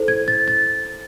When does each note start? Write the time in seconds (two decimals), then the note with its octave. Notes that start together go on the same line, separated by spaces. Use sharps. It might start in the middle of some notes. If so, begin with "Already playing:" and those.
Already playing: E4 A4 C5
0.08 G#6
0.28 A6
0.48 A6